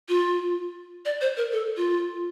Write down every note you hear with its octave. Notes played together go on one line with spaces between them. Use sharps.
F4
D5
C5
A#4
A4
F4